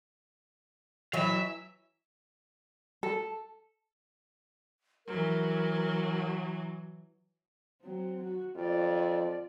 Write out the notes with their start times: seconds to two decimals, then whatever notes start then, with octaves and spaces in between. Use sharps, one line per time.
1.13 E3 F#3 E5 F5
3.03 A4
5.07 E3 F#3 A#4
7.82 F#3 C4
8.23 F#4
8.56 F2 F4 D5